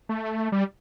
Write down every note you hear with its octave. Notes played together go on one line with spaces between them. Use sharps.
A3
G3